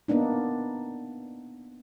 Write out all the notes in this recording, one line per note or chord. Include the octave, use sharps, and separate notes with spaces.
A#3 B3 D4 D#4